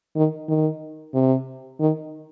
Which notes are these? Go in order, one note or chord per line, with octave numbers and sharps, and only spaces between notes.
D#3
D#3
C3
D#3